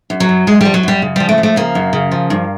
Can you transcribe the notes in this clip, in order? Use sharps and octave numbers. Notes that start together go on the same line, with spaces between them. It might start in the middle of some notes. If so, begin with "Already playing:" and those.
F#2
F#3
F#2
F#2 G#3
F3 G3
F#3
F#2 G3
C#3
F3 G3
A3
F3
A3
C#3 A#3
F#2
C#3
F3
G2